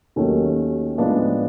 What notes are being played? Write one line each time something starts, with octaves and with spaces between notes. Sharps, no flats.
D#2 D#3 F#3 A3 C#4
A2 F3 G#3 B3 D4